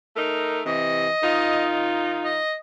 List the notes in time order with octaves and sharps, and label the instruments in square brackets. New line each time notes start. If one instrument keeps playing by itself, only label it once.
[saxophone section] A3 D#4 A#4
[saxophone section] C3 E3 [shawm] D#5
[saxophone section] D#3 D#4 F4
[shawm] D#5